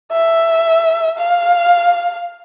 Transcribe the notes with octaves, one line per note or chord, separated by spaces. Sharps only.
E5
F5